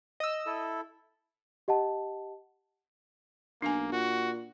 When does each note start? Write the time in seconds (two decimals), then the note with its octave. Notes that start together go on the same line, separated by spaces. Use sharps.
0.20 D#5 E6
0.46 E4 A4
1.68 G4 D#5 F#5 A5
3.62 B1 A#3 D4 G#5
3.92 A#2 F#4